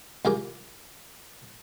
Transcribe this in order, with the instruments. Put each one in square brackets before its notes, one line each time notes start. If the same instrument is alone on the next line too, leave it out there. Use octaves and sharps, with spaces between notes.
[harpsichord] C2 F4 G#4 A#4 D6